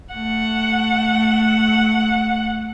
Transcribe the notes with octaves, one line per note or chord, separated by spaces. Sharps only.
A3 F#5